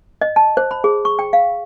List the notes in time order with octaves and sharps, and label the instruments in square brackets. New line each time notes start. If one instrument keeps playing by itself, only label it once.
[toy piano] D#5
A5
C5
B5
G#4
C#6
G5
F5